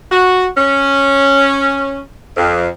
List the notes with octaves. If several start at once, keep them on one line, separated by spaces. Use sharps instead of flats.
F#4
C#4
F2